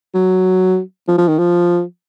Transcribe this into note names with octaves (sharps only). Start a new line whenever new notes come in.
F#3
F3
F3
D#3
F3